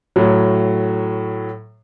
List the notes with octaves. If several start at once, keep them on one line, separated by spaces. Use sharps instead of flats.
A2 F#3